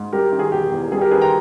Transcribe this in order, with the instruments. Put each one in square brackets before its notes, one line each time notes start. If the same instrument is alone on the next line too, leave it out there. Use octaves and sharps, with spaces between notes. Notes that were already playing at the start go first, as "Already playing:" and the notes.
Already playing: [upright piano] G#2
G3 G4 A#4
D#3
G#4
E1 G4
E2
G3 G#4
G4 A#4
D#3 G#4 B4
G5 A#5